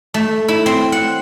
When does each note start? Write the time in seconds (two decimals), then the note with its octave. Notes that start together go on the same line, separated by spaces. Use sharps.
0.14 A3
0.48 E4
0.66 C4
0.92 F#5